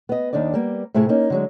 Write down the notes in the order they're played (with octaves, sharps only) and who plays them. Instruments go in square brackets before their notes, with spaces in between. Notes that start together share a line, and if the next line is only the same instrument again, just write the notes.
[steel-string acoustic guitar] B3 D#5
D#2 D#3 D4 D#4 D5
G3 A#3 B3
A2 C3 A3 E4 G#4
A#3 C#4 D#4
D3 F#3 G#3